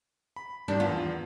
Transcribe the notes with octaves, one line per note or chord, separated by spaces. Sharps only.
B5
D#3 G3 D4
E2 B3 F4